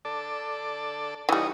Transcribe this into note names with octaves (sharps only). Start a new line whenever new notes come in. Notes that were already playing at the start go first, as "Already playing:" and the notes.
A4 D5
E3 G3 D#4 C#5 D#5